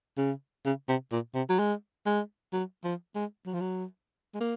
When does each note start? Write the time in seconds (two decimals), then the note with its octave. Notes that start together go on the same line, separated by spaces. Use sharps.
0.18 C#3
0.66 C#3
0.89 C3
1.12 A#2
1.35 C3
1.50 F#3
1.59 G#3
2.07 G#3
2.53 F#3
2.84 F3
3.16 G#3
3.46 F#3
3.54 F3
3.61 F#3
4.35 G#3
4.41 A#3